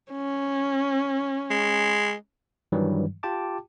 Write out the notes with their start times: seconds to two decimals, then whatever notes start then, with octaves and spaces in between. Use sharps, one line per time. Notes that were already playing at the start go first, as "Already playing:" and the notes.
0.11 C#4
1.50 G#3
2.72 G2 D#3 E3 F#3 G3
3.23 F4 G4 G5 A5 D6